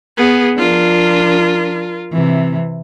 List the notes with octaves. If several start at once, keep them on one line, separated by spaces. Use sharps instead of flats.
B3 G#4
F3 D4 F4 A#4
C3 E3